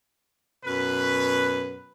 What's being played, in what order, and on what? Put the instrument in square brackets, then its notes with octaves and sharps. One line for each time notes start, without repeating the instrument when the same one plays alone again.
[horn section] F#2 B2 B4